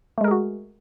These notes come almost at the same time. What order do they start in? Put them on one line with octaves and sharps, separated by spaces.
A3 G#3 A#4 G#4 F#4